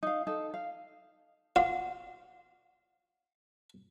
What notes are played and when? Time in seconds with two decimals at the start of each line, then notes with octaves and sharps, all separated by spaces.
0.03 D#4 F5
0.27 D#4 A4
0.54 F5
1.56 F4 F#5